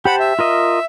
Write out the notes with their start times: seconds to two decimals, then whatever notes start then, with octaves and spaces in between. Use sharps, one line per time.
0.05 G4 C5 F#5 A5 B5
0.20 E5
0.39 F4 A#4 D#5